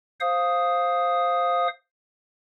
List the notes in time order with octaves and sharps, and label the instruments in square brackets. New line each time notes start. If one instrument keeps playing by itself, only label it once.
[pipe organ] C5 F5 D#6